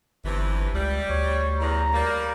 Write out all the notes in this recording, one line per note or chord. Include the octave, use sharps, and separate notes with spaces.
G1 G2 C3 E3
C#2 G3
D2 C#5
E2 A#5
G3 A#3